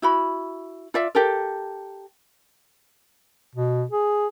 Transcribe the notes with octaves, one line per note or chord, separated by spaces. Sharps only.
E4 F#4 B5
F4 D5 E5
G4 A4 A#4
B2
G#4